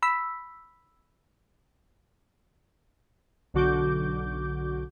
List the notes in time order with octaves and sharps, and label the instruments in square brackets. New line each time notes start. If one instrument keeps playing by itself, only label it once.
[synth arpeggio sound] B5 E6 B6
[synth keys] B1 D3 F#4 D6 G6